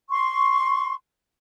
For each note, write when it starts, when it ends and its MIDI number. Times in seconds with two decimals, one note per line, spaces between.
0.09 0.93 84
0.09 0.93 85